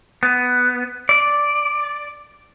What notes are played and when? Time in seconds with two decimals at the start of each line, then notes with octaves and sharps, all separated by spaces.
0.23 B3
1.09 D5